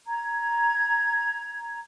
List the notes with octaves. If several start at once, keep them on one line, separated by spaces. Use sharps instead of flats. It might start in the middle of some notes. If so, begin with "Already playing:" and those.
A#5 G#6